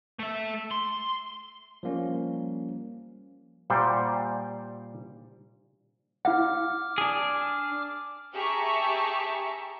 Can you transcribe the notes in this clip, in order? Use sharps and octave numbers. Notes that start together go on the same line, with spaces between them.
A3 E5
C6
F3 G3 A#3 C#4
A#2 G3 C5 F#5 G5
E4 F5 F#5 D6 F6
D4 G#4
G4 G#4 E5 A5 A#5 C#6